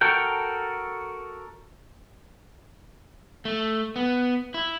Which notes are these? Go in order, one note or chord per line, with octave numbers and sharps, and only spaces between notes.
F#4 A4 A#4 G5
A3
B3
E4